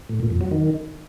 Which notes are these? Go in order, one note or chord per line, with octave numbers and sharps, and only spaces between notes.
A2
A#2
F2
F#3
D#3